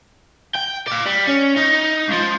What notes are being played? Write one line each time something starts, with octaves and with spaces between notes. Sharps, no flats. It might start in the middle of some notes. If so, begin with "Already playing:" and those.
G5
D5 F5
G3
C#4
D#4
C#2 F3